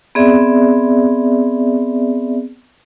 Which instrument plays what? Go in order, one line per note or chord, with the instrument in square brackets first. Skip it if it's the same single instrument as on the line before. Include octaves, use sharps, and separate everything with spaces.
[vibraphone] B3 C4 G#4 D5 E5